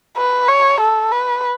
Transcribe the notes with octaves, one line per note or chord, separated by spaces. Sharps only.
B4
C#5
A4
B4